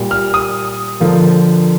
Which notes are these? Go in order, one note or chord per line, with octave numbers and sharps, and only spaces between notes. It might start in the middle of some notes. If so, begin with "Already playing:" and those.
Already playing: A#2 G3 A#3
F6
D#6
D3 F3 A#3